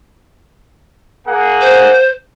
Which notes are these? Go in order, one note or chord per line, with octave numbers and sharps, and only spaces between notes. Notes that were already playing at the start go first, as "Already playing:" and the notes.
A#3 G#4 F#5
C5